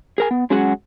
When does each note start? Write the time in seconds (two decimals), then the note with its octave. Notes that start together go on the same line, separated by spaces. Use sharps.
0.18 G#4 A#4 G#5
0.31 B3
0.50 F#3 G#3 C#4 F#4 G#4 F#5